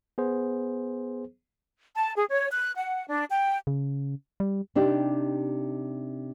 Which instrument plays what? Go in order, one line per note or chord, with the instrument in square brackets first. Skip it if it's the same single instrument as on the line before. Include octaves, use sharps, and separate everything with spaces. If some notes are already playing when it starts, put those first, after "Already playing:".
[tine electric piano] B3 G#4 C5
[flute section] A5
G#4
C#5
F#6
F#5
D4
G5
[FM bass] C#3
G3
[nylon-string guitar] C3 D4 D#4 G4